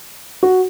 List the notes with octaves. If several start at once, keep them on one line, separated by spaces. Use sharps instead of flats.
F#4